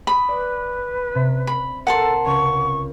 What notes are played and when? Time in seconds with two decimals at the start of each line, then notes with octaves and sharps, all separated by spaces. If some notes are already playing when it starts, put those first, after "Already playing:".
0.07 B5 D#6
0.29 B4 D5
1.12 C3 B6
1.47 B5
1.87 A4 A#4 F#5 A5 C6 A#6
2.26 C#2 C#6